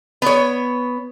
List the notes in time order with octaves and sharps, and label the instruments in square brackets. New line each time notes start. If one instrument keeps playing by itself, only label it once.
[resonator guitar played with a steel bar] B3 C#5